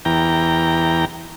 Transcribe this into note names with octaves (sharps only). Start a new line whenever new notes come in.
E2 G5 A#5